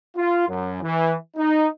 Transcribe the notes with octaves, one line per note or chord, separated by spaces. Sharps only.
F4
F#2
E3
D#4